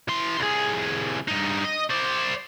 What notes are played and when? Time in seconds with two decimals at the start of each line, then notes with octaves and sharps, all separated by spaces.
0.08 E3 C6
0.38 C2 G#4
1.28 G2 D#4
1.64 D#5
1.90 C5 D5